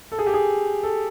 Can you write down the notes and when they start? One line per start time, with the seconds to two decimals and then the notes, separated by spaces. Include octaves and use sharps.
0.12 A4
0.19 G#4
0.26 G4
0.34 G#4
0.83 A4